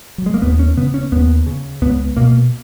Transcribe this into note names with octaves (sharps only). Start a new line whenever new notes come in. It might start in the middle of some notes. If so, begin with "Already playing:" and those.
F#3
G#3
A#3
D#2 B3
C#4
C#3 B3
C#4
D#2 B3
C#3
C#2 B3
B2 A#3